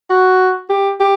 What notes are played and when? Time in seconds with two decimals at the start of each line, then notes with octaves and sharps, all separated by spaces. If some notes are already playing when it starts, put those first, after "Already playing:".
0.10 F#4
0.70 G4
1.00 G4